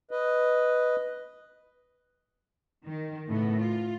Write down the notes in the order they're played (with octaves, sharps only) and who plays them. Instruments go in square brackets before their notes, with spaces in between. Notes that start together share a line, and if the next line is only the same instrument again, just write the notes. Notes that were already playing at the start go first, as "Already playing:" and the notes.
[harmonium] B4 D#5
[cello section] D#3
A2 C#3 A3 B3
F4